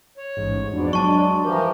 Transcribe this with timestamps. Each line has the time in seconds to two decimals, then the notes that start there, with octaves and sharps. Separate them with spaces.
0.18 C#5
0.37 A1 G#2
0.72 F2 G#2 B2 D4 D5
0.93 F#3 G#3 A5 C#6
1.44 E3 F3 G4 A#4